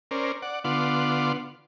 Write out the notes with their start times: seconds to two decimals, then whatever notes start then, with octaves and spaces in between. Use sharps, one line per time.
0.11 C#4 A#4 C5 D5
0.42 D5 F#5
0.64 D3 B3 F4 F#5 C6 D6